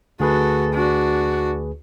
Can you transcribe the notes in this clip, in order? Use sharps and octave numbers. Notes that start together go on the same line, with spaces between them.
D2 F#4 G#4 A4 B4
D4 F#4